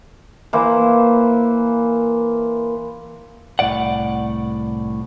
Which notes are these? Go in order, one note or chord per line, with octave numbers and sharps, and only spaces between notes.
E3 A#3 C5
C2 A2 C#3 D5 F#5